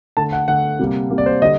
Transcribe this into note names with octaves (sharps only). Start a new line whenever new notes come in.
D3 A3 A5
F#5
D3 A3 F#5
C3 G3 A#3
C3 G3 A#3
D5
C5
D3 G3 D#5